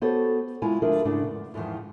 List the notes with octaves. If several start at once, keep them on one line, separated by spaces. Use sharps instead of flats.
B3 F#4 G4 A4 C5 C#5
G#3 E4 F4 C#5 G#5
D2 F3 D4 G#4 A#4 E5
G#2 C#3 A3 D4 E4
E2
E2 G#2 C3 D#3 F3